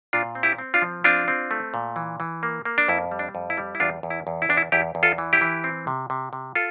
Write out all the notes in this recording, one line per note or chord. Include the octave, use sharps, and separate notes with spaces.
A#2 D4 F4
C4
E4 G4
C4
D4 F4
F3
C4 D4 F4
C4
A3
A#2
E3
E3
A#3
A#3
D4
F2 E4
G3
D4
F2
E4
G3
E4
E2 D4 F4
E2
E4
E2
E4
E2 D4
E4
E2 E4 G4
E2
F4 A4
E3
E4 G4
E3
C4
C3
C3
C3
F4 A4